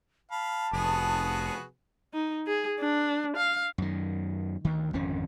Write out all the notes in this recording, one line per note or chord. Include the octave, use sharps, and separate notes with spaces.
F5 A5 B5
F1 B3 F#4 G#4
D#4
G#4
D4
F5
F#2 D#3
D2 D#3
G#1 F2 D3 C#4